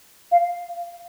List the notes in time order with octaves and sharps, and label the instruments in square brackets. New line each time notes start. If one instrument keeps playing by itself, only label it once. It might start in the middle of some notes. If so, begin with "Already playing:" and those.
[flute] F5